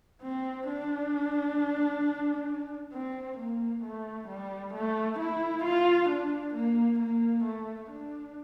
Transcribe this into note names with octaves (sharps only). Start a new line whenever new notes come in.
C4
D4
C4
A#3
A3
G3
A3
E4
F4
D4
A#3
A#3
A3
D4